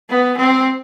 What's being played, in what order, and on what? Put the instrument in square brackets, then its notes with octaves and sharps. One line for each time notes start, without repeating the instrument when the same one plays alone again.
[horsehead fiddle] B3
C4